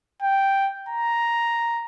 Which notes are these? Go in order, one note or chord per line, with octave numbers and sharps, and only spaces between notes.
G5
A#5